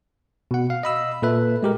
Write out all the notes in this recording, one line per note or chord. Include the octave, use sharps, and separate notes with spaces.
B2 F#5
F5
D#5 B5 E6
A#2 A4 B4 E5
G#3 G4 A#4